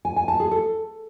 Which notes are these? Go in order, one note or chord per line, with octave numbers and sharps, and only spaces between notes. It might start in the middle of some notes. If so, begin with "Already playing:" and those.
G#5
G#5
A5
G#4
A4